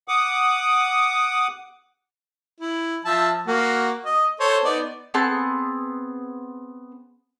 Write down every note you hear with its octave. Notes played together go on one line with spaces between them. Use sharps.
F#5 D6 D#6
E4
F3 E5 A5
A#3 F#4
D#5
A4 C5 C#5
B3 D#4 D5
B3 C4 G#4 A5